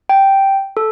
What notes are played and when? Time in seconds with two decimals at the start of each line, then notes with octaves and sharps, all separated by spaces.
0.09 G5
0.77 A4